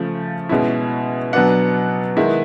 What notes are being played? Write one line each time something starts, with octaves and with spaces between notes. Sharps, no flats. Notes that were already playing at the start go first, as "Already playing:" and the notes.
Already playing: C#3 F3 A3
B2 G#3 C#4 E4
B2 F#3 B3 D4 F#5
D#3 G#3 B3 E4